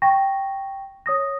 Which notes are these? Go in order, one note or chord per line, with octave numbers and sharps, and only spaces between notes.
G5 C#6 A#6
C#5 D#6 A#6